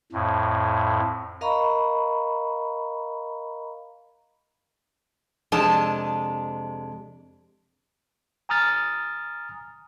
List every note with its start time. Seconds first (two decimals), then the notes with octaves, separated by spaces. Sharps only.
0.12 F2 A2
1.41 A#4 D#5 F5 A#5 B5 C#6
5.52 F2 C3 G#3 D4 A5
8.49 G#5 A#5 D#6 F6 A6